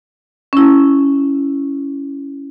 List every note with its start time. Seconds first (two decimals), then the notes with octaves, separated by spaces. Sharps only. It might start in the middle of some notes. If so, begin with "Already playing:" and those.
0.53 C#4 E4